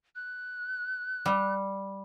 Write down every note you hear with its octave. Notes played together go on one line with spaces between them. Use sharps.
F#6
G3